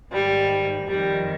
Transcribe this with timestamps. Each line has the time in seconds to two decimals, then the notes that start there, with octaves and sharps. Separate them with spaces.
0.10 G#2 D#3 G3
0.87 F2 D#3 G3